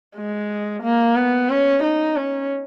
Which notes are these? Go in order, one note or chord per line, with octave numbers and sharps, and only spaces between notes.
G#3
A#3
B3
C#4
D#4
C#4